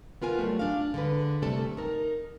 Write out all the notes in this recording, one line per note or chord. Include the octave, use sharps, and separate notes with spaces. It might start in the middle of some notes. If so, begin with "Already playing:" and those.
B3 F4 A#4 G#5
F#3 G3 A3
D4 F5
D3 G#3 B4
C3 G3 A3 A4 A5
D#4 A#4